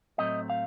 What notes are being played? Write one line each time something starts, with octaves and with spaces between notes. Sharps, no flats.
A2 F#3 A3 C4 D#5
F5